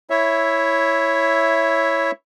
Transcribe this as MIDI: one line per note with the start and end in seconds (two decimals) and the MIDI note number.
0.10 2.11 64
0.10 2.11 73
0.10 2.11 76